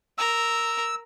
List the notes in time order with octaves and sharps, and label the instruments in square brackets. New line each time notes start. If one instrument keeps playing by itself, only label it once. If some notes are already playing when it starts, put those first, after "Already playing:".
[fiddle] A#4 [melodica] E6